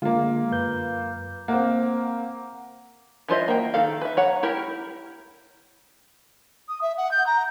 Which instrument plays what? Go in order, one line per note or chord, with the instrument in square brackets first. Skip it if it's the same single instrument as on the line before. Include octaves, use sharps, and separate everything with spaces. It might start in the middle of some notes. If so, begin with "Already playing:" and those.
[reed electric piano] D3 G#3 [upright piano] A#3 F4
[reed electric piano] F#2 B4 G6
[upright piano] A#3 C4 [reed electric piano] F#5
[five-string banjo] E3 F4 C5 D#5 E5
A#3 G5
D#3 A4 F5
B4 E5
C#5 F#5 A#5
E4 G4 A#4
[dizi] D#6
E5
F#5
G6
A#5